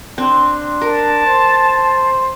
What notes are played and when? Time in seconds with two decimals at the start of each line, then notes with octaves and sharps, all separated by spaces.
0.18 C4 D4
0.81 A#4 A5
1.26 C5